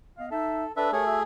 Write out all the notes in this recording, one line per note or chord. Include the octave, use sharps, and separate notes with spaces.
B3 D#5 F5
D#4 A4 E5
D4 A4 B4 E5
A3 G4 G#4 A#4 C#5
F#4 E5 E6